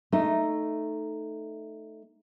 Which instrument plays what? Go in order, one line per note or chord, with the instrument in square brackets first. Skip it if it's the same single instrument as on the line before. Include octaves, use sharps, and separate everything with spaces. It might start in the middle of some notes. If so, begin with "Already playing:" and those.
[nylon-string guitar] A3 D#4